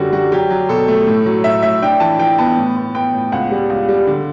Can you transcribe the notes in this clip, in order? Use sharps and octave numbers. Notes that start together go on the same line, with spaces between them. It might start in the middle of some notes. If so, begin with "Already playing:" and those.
Already playing: F#2 D3 G3 F#4 A4
G3 F#4
F#3 G4
F#3
B2 A4
A3
A2
F#3
A2 E5
A2 E5
D4 G5
E3 A5
E3 G5
B3 A5
A2
B3
B3 G5
A2
C#2 F#5
G3
C#2
G3
D3